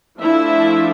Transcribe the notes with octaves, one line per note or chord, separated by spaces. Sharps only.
F3 A3 D4 E4 E5